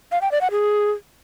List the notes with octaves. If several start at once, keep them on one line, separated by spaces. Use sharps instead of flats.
F5
G5
D5
F#5
G#4